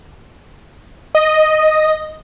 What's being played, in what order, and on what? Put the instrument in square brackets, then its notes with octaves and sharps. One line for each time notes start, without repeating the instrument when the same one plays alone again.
[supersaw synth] D#5